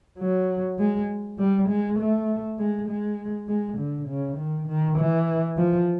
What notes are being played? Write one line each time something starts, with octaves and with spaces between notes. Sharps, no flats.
F#3
G#3
G3
G#3
A3
G#3
G#3
G#3
D3
C#3
D#3
D#3
E3
F3